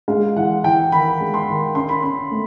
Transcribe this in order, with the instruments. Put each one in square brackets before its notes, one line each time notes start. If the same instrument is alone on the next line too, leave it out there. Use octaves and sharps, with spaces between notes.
[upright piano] G#3 [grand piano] F5
[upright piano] E3 [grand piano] F#5
[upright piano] E3 [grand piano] G5
[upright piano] D#3 [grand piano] B5
[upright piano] G#3
[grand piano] C6
[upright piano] D#3
[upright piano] C#4 [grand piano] C6
[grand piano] B5
[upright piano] C#4 [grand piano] C6
[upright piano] A3